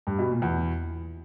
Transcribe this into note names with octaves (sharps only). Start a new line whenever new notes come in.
G2
B2
A#2
E2